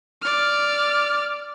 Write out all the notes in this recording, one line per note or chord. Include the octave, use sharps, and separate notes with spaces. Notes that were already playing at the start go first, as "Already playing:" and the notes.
D5 F6